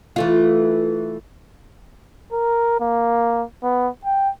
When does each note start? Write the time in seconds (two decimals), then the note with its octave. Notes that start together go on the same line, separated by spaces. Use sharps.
0.16 E3 A3 F4
2.33 A#4
2.81 A#3
3.63 B3
4.05 G5